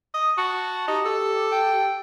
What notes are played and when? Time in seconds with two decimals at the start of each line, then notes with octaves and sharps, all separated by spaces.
0.14 D#5
0.38 F#4 A5
0.88 D#4 G4
1.05 A4
1.52 G5